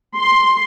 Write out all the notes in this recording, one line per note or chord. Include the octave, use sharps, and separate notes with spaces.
C6